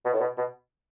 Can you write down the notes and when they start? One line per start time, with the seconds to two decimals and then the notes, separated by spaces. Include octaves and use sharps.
0.05 B2
0.14 A2
0.21 B2
0.37 B2